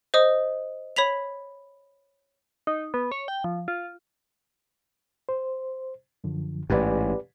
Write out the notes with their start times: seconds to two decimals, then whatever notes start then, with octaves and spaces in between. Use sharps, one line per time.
0.14 C5 D#5 D#6
0.96 C#5 B5 B6 F7
2.67 D#4
2.94 B3
3.12 C#5
3.28 G5
3.44 F3
3.68 F4
5.29 C5
6.24 F#2 D3 F3
6.70 A1 G#2 G4 B4 D5